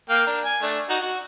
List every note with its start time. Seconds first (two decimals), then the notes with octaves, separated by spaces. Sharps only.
0.09 A#3 F5 G5
0.27 D4 A#4
0.45 G#5
0.62 A3 D4
0.89 D#4 F#4
1.01 F#4